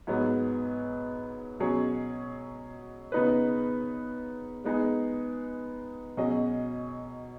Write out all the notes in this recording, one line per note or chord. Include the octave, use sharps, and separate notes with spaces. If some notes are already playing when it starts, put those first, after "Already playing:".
G#2 F#3 B3 G#4
B2 F#3 C#4 G#4 C#5
C#3 B3 D#4 B4
G#3 B3 D#4 G#4
B2 F#3 C#4 G#4 D#5